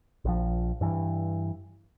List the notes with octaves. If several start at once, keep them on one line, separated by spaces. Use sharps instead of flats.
A#1 F3
G2 E3